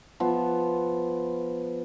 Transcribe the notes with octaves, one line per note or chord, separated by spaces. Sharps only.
F3 B3 E5